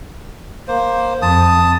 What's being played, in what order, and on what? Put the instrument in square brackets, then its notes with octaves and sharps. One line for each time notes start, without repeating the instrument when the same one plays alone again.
[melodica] A#3 C5
[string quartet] F2 [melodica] A5 D#6